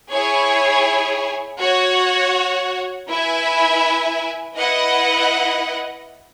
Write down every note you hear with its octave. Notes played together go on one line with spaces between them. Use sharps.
E4 G#4 C#5 G#5
F#4 C#5 F#5
E4 B4 E5 G#5
E4 B4 D#5 F#5